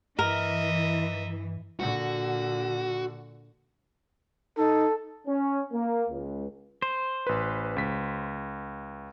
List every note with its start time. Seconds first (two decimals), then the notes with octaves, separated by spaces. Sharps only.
0.19 G2 E3 A#4 D#5 E5
1.80 A#2 D3 F#4
4.57 D#4 A4
5.28 C#4
5.72 A#3
6.10 C#2
6.82 C5
7.27 A1 B4
7.76 C#2 B6